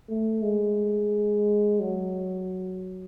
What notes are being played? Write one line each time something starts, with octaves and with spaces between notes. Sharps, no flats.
A3
G#3
F#3